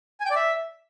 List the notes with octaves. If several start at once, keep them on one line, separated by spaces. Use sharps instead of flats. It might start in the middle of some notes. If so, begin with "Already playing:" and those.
G#5
G5
D5
E5